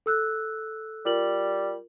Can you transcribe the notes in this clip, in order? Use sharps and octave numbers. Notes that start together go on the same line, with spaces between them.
A4 E6 F#6
G3 F4 A#4 F#7